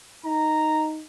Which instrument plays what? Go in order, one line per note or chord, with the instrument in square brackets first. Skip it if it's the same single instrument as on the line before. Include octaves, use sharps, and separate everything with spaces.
[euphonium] D#4 [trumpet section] A#5